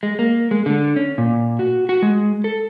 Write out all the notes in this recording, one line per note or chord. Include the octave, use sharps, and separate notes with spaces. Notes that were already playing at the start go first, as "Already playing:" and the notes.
G#3
A#3
G#3
D3
C#4
A#2
F#4
F#4
G#3
A4